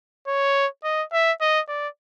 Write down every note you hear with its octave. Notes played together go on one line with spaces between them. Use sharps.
C#5
D#5
E5
D#5
D5